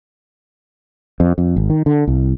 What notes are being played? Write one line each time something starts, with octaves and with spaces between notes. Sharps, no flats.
F2
F2
G#1
D#3
D3
C2